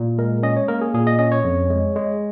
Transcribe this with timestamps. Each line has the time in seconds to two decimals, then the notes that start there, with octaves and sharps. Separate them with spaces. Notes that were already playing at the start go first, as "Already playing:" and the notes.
Already playing: A#2
0.18 G#3 A#4
0.43 C#4 D#5
0.57 C#5
0.68 A#3 A#4
0.81 G#4
0.94 A#2 G#4
1.07 D#5
1.19 C#4 D#5
1.32 C#5
1.44 F2
1.70 G#3
1.96 G#3